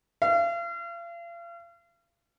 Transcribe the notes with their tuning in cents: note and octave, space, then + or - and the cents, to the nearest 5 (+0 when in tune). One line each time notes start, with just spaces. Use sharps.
F5 -40